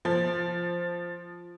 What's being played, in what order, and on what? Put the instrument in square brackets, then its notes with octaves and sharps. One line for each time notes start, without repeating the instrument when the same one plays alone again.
[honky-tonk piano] F3